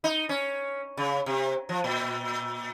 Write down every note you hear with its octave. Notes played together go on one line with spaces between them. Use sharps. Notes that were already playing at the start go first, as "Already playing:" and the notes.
D#4
C#4
C#3
C3
F3
A#2